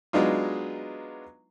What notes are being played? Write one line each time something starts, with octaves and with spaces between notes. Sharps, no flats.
F#3 G#3 B3 D4 D#4 F4